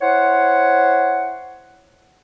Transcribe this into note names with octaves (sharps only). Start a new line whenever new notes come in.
E4 C5 C#5 F#5